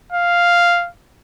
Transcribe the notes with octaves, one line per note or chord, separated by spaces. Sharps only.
F5